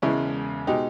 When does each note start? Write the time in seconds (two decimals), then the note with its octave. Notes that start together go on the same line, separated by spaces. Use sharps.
0.02 E1 E2 C#3 G#3 C#4 E4
0.67 B2 G#3 D#4 G4